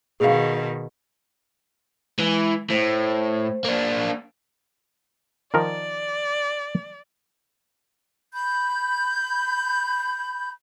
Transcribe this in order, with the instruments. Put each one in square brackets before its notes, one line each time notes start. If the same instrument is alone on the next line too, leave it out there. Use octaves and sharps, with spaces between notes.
[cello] B2 D#3 [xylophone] G#4 F5
[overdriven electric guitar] E3 [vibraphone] G#3
[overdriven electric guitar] A2 [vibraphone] C5
[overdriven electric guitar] A#3 D4
[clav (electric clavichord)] D#3 F3 A#4 [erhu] D5
[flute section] B5 G6